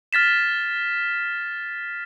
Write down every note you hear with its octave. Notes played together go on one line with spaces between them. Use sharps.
F6 A6 B6 E7